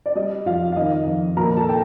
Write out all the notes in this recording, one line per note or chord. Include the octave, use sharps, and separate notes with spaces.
D5
G3 D#5
F2 F4 F5
F5
D#3 D#5
F2
A#1 A#4 A#5
A4 A5
G5